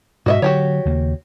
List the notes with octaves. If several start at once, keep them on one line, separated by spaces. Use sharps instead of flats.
G#2 B2 F#4 D#5 E5
D3 F#3 F#4 G4 C#5
D#2 C#3 A#3